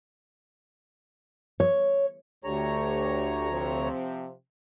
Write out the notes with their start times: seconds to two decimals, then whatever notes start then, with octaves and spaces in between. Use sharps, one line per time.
1.60 C#5
2.44 D2 D3 G4 C#5 A#5
3.51 C3 F3 C4